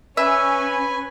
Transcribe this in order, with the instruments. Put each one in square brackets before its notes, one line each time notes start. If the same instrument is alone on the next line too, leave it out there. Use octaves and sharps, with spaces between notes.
[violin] C#4 [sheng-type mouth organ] B4 G#5 [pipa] E5